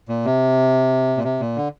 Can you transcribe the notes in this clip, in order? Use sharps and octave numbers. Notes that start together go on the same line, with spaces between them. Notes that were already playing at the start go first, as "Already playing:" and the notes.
A#2
C3
A#2
C3
A#2
D3